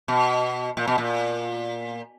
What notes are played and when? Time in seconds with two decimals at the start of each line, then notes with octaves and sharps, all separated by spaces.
0.08 B2
0.77 A#2
0.88 B2
0.98 A#2